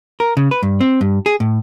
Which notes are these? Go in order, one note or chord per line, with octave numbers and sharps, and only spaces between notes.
A#4
C#3
B4
G2
C4
G2
G#4
A2